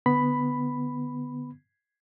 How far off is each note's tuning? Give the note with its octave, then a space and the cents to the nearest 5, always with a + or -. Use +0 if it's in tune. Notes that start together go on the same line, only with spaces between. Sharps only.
D3 +0 B3 +5 B5 +5